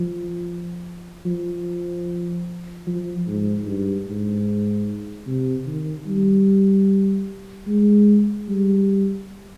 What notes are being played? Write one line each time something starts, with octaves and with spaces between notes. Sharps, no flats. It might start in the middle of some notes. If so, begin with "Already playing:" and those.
Already playing: F3
F3
F3
G#2
G2
G#2
C3
D#3
G3
G#3
G3